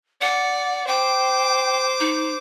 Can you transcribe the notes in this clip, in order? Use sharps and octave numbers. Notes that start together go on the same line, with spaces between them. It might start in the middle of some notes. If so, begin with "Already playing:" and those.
D5 F#5
C5 G5 D6
D#4